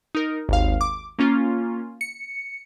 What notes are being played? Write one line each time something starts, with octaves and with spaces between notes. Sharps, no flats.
D#4 A#4
G#1 D#2 F5
D6
A#3 C#4 F4
C#7